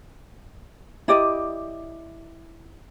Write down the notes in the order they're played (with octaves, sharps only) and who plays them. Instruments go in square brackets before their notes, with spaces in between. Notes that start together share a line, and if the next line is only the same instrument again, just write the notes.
[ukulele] E4 G4 D5 D#5